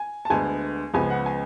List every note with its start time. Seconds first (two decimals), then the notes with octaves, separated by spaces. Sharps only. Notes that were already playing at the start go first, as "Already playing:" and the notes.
Already playing: G#5
0.25 A5
0.30 D2 D3 G#3 B3 G#5
0.94 C#2 C#3 F3 B3 G#5
1.10 F#5
1.26 G#5